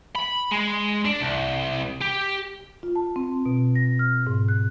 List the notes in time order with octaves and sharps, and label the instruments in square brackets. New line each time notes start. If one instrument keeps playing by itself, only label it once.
[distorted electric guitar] B5
G#3
D4
C2
G4
[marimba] F4
A5
C4
B2
A#6
F6
G#2
F#6